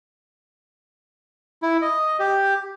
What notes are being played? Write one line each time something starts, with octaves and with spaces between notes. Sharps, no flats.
E4
D#5
G4